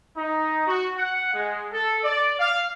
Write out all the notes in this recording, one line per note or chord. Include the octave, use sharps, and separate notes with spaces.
D#4
F#4
F#5
G#3
A4
D5
F5